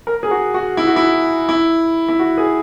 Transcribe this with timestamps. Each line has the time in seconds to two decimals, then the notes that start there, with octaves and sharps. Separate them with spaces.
0.07 A#4
0.23 G#4
0.31 F#4
0.54 F#4
0.77 E4
0.87 F#4
0.96 E4
1.49 E4
2.08 E4
2.19 F#4
2.37 G#4